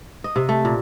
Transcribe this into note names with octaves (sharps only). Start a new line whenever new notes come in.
D#5
C3
A3
A#2